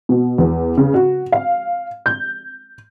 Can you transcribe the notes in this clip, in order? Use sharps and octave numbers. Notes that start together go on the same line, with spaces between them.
B2
E2
C#3
F#4
F5
G6